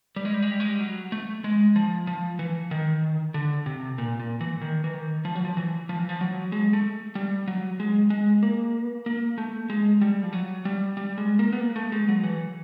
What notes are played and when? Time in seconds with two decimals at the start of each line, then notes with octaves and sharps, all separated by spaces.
0.16 G3
0.25 G#3
0.34 G3
0.42 G#3
0.51 G3
0.60 G#3
0.69 G3
0.80 F#3
1.12 A3
1.44 G#3
1.76 F3
2.07 F3
2.39 E3
2.71 D#3
3.34 D3
3.66 C3
3.98 A#2
4.20 A#2
4.41 E3
4.61 D#3
4.84 E3
4.94 D#3
5.25 F3
5.35 F#3
5.45 F3
5.57 E3
5.89 F3
5.99 E3
6.09 F3
6.21 F#3
6.52 G#3
6.73 A3
7.15 G3
7.48 F#3
7.80 G#3
8.10 G#3
8.43 A#3
9.06 A#3
9.38 A3
9.70 G#3
10.01 G3
10.23 F3
10.33 F#3
10.65 G3
10.97 G3
11.18 G#3
11.39 A#3
11.53 B3
11.60 A#3
11.76 A3
11.92 G#3
12.08 F#3
12.24 E3